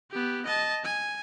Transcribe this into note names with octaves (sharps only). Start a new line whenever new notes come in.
B3 G4
D#5 A5
G#5